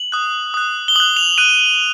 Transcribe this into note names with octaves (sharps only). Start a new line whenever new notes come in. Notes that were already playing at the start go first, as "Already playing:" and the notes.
Already playing: F#7
D#6 F#6
D#6 F#6
G7
D#6 F#6 F#7
F7
D#6 F#6 D#7